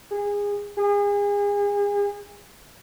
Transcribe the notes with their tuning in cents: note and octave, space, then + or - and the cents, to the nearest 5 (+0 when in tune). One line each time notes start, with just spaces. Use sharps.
G#4 -25
G#4 -35